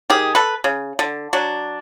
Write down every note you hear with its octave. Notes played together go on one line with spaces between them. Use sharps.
D#3 G4 G#4
A4 B4
C#3
D3
F#3 D4